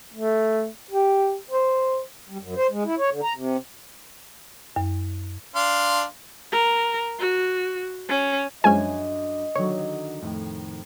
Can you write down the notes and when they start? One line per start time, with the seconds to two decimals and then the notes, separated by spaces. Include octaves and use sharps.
0.14 A3
0.91 G4
1.51 C5
2.28 G3
2.40 F#2
2.57 C5
2.70 G#3
2.85 E4
2.99 C#5
3.11 D3
3.23 A#5
3.35 C3
4.76 F#2
5.55 D4 F5 C6
6.52 A#4
7.19 F#4
8.09 C#4
8.64 F#2 F3 G#3 C#4 D4 D#5 E5 G#5
9.56 D3 D#3 F#3 C#5
10.22 F2 A2 D#3